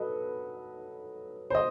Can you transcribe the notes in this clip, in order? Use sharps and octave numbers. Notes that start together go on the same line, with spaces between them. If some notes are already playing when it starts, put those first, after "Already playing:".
Already playing: F#3 A4 B4 D#5
C5
D#5